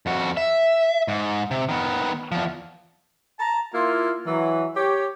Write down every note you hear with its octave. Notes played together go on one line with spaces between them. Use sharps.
F2 F#4
E5
G#2
C3
D#3 B3
E2 F3
A5 A#5
A#3 E4 F4
E3 F#3
G4 C#5